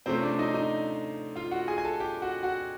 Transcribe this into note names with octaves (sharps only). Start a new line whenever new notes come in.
C3 F3 A3 C4 C#4 C5
D4 D5
D#4 D#5
D#4 D#5
F4 F5
F#4 F#5
G#4 G#5
G#5
A4 A5
G4 G5
F#4 F#5
F#4 F#5